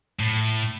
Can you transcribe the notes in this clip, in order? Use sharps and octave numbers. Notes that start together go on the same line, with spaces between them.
A2